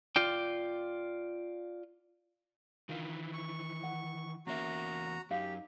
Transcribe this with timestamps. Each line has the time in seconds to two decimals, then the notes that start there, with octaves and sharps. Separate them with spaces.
0.16 F4 D5 G5
2.89 D#3 E3 D4 F4 A#4
3.34 C#6
3.83 F#5
4.47 E2 A#3 C#4 F#4 E5 A#5
5.31 F#2 D#4 G4 F5